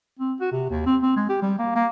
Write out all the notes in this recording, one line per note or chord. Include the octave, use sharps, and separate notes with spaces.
C4
F#4
C3
D#2
C4
C4
G#3
G4
G3
A#3
A#3